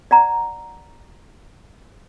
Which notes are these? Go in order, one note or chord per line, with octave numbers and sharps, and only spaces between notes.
D5 F#5 A#5